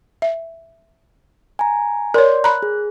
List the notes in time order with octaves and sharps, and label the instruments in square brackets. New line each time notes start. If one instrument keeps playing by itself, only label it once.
[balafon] E5
[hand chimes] G#5 A#5
[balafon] A#4 C#5 [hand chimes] D5 C6 G6
[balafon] A#5 B5 [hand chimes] F#6
[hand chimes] G#4